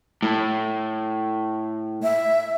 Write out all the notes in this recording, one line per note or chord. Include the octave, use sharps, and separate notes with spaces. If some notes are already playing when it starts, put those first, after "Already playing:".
A2
E5